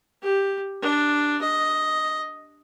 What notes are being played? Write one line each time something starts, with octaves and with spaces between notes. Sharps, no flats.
G4
D4
D#5